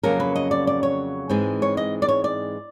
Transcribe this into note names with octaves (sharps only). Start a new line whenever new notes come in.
F2 C#3 F#3 A#3 C#4 A#4
B4
D#5
D5
D5
C#5
G#2 E3 G#3 C4
C#5
D#5
D5
C#5
D5